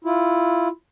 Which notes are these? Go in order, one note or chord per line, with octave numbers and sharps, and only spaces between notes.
E4 F4